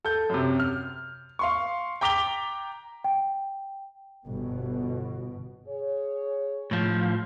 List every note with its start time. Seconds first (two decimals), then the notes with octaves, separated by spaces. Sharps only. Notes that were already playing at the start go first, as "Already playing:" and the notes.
0.05 A4 G6
0.30 F#2 C3
0.60 F6
1.39 F5 C6 C#6
2.01 G5 A#5 D6 B6 F7 G7
3.04 G5
4.26 G1 B2
5.67 G#4 C#5
6.71 A2 F3